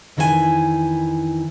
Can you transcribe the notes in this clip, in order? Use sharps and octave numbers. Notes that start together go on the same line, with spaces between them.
F2 D#3 E3 E4 F4 G#5